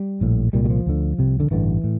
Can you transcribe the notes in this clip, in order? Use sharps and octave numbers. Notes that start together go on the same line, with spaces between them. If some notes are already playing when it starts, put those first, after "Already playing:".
Already playing: G3
A#1 A2
C2 A#2 G3
G3
F3
D2 D3
C2 C3
D3
A1 G2 D3 E3
A2